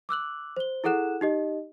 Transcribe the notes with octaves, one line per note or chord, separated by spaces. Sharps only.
D6 E6 F#6 F#7
C5 G7
E4 G#4 A4 F#5 F#6 E7
D#4 G4 D#5